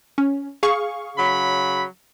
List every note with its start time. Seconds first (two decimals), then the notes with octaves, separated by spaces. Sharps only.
0.18 C#4
0.63 G#4 F5 C#6
1.18 C#3 F#3 B5